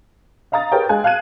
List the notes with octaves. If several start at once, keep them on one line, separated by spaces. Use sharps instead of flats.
D#5 F5 A#5 D#6 A6
G4 G#4 A#4 B4 C#5 G5
G#3 F5 G#5 F#6
F5 A5 F#6 G#6 D#7